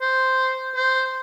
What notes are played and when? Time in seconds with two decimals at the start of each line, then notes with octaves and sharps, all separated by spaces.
0.01 C5
0.75 C5